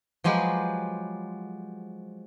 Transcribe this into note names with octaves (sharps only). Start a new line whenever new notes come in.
F3 F#3 G#3 G4 B4